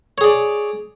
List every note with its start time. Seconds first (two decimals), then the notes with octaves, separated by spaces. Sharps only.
0.18 C#5
0.21 G#4
0.24 D5